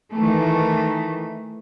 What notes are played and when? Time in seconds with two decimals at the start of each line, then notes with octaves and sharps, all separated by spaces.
0.13 D#3 E3 A3